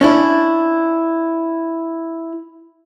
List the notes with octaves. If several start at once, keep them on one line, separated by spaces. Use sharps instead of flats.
C#4 D4 E4